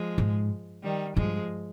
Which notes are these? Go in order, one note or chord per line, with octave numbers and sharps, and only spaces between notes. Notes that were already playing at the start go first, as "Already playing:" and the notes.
Already playing: F3 G#3
G#2
D#3 G3
G2 F3 G#3